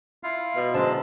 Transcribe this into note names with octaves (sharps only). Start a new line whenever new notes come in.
E4 F4 F5
B2
D3 F#3 G#3 C5 A5